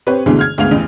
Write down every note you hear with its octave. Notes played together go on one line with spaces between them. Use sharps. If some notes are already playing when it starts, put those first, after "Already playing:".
C4 G4 B4 C#5
D2 B2 D3 E3 G#3
F6 G#6
D2 G#2 B3 F5 F7
A1 E2